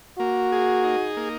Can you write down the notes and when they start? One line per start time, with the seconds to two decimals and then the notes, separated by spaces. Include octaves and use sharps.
0.19 A#3 F#4
0.52 G#4
0.84 D#4
1.17 A#3